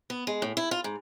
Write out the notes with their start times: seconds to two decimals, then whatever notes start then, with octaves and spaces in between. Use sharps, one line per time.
0.10 B3
0.27 G#3
0.42 A2
0.57 E4
0.71 F4
0.84 G#2